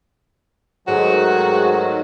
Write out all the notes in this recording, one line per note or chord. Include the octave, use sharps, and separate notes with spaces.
G#2 D#3 F#3 A3 F#4